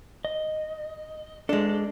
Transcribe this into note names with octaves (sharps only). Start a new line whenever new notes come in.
D#5
G#3 D4 A4